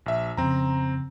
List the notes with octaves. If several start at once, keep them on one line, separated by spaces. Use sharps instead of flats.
A#1 E5
F2 C#3 C4 A#5